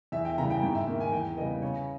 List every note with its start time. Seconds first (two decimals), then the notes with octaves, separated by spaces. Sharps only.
0.12 E2 E5
0.25 G5
0.38 C#3 E3 G3 A#5
0.50 G5
0.62 G#2 G5
0.75 E5
0.87 D#3 A#3 G5
1.00 G#5
1.12 E2 G5
1.37 C#3 G3 B3 D#5
1.62 C#3 C#5